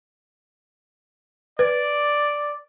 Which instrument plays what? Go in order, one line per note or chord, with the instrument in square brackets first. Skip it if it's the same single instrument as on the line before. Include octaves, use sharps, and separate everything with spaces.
[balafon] B4 [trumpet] D5